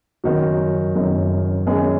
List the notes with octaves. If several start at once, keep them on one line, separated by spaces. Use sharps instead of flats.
F#1 F#2 D#3 F#3 F#4
F#1 F#2 D#3
F#1 F#2 D#3 G#3 G#4